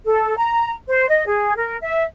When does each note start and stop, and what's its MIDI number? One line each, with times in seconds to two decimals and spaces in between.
0.06 0.36 69
0.36 0.73 82
0.87 1.06 72
1.08 1.24 75
1.26 1.55 68
1.56 1.76 70
1.81 2.03 76